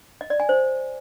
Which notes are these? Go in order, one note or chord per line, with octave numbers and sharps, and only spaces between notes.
D#5
D5
G#5
C5